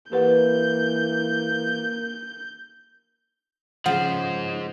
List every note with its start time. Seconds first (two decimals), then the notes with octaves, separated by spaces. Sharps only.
0.12 E3 A#3 G4 B4 F#5 G6
3.86 C#3 F3 G#3 C5 F#5